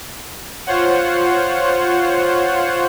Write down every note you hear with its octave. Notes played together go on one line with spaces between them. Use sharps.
F4 C5 C#5 F#5